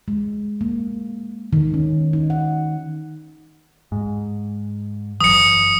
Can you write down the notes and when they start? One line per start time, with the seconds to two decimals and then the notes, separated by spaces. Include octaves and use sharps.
0.08 G#3
0.61 A#3
1.53 D#3
1.74 C#4
2.13 D#4
2.30 F#5
3.92 G#2
5.21 F#1 E3 F#3 D#6 C#7